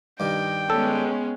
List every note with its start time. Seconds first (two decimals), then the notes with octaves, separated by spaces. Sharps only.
0.20 G2 D#3 G5
0.70 G#3 B3 C#4 A4